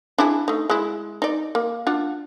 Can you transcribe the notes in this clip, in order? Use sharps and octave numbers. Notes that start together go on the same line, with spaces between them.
D4 E4 G#4
A3 D#4
G#3 E4
D#4 D5
A#3
D4 F4 F#5